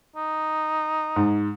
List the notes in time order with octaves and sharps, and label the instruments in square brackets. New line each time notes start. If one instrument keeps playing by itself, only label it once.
[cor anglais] D#4
[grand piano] G#2